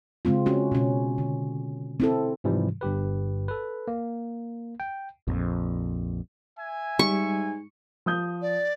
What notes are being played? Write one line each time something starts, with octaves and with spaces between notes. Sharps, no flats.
C#3 G#3 C4 F4
C#4 F#4
B2 C#4
D3
C4 E4 A4
G#2 C3 E3 F3 G3
G1 G2 G4 B4
A4 B4
A#3
G5
A#1 F2
E5 G#5
G#2 G3 C#6
F3 D#6 G6
D5